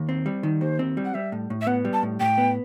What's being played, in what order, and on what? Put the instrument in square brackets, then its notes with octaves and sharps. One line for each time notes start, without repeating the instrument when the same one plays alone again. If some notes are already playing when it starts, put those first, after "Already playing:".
Already playing: [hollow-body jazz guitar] D#2
C4
G3
D#3
[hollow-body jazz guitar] D#2 [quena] C5
[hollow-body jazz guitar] C4
G3
[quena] F#5
[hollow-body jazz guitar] G3 [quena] E5
[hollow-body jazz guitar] A2
A2
[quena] E5
[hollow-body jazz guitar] B3 [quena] F#5
[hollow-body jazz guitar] G3
[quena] A5
[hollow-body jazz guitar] A2
[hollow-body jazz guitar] A2 [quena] G5
[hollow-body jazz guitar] B3